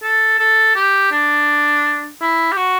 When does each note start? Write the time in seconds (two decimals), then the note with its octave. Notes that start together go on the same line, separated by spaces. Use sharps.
0.03 A4
0.39 A4
0.76 G4
1.12 D4
2.21 E4
2.52 G4
2.57 F#4